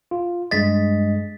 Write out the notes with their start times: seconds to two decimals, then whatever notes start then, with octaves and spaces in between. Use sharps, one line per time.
0.11 F4
0.51 G2 G#3 D#5 A6 B6